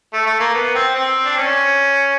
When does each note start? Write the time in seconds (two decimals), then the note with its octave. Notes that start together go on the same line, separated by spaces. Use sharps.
0.13 A3
0.26 A3
0.40 A#3
0.54 B3
0.75 C4
0.95 C4
1.25 D4
1.37 C#4